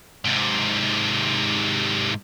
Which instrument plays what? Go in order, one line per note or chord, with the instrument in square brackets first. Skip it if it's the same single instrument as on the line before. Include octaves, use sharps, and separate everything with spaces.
[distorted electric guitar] G#2 C3